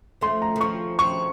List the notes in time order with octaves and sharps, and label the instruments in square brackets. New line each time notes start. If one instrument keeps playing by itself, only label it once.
[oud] F3 A3 [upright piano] C6
[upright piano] A#5
[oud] D#3
[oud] F3 [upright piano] C#6
[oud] F3 [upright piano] C#6